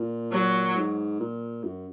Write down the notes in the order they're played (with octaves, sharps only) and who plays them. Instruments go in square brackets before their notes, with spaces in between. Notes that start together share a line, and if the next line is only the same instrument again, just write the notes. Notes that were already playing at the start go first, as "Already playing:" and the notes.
Already playing: [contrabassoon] A#2
[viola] F#3
[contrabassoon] G#2
A#2
F#2